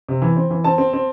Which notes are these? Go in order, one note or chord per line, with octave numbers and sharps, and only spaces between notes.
C3
E3
C4
E3
C4 A5
C4
C4